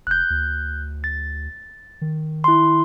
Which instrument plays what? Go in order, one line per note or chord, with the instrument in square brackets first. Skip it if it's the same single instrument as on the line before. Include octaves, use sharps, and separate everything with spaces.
[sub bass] F1 [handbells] F#6 G6
[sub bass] D2
[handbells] A6
[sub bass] D#3
[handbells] E4 C6